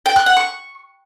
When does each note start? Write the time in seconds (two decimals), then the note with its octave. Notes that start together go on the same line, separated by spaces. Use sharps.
0.06 G5
0.16 F#6
0.26 F#5
0.37 C#6